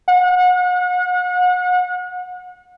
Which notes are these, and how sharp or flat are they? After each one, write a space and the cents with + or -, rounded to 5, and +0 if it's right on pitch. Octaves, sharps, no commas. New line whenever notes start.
F#5 -35